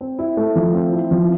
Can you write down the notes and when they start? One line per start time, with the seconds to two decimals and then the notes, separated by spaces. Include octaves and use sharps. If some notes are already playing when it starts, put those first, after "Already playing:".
0.01 C4
0.19 E4
0.37 A3
0.56 F3
0.74 C4
0.93 E4
1.11 F3